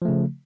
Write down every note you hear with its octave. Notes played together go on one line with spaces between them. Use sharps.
C#3 F3 A3